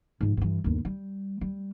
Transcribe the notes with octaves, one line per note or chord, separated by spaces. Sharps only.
G#2 F3
G2 E3
G1 D#2
G3
G3